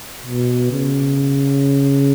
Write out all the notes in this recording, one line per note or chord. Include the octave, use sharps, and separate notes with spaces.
B2
C#3